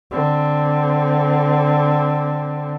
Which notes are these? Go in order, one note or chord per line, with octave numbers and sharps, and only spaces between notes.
D3 C4